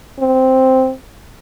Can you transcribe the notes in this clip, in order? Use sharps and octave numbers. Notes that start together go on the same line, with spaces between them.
C4